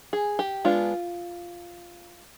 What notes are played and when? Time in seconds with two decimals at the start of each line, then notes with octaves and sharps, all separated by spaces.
0.13 G#4
0.39 G4
0.65 G#3 B3 D4 F4